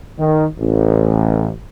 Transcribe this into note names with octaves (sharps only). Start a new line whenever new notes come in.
D#3
A1